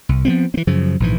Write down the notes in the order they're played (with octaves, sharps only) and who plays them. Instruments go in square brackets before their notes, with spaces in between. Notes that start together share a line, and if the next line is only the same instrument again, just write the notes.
[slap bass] C2
F3 G3 B3 C4
E3 C4
F#2 C#3 F3
A#1 G#2 E3